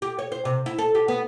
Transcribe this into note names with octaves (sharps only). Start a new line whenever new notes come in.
G4
C#5
C5
C3
E4
A4
G4
B3